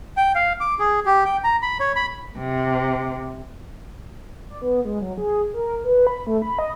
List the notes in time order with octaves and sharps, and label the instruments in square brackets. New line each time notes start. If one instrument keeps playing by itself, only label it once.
[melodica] G5
F5
D6
G#4
G4
G5
A#5
B5
C#5
B5
[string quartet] C3
[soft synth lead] D5
B3
G#3
F#3
G#4
A#4
B4
B5
A3
B5
D#5